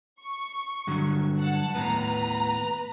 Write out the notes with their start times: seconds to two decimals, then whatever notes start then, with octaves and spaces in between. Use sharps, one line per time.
0.21 C#6
0.87 G2 D3 F#3
1.39 F#5 A5
1.75 D#2 A2 B3 B4 A#5